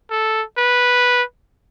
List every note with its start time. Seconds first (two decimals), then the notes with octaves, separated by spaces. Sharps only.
0.11 A4
0.58 B4